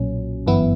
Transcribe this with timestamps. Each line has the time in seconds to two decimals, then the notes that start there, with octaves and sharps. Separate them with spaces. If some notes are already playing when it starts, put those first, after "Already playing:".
Already playing: B1 A#2 F#3 C#4
0.47 G1 F#2 E3 B3 E4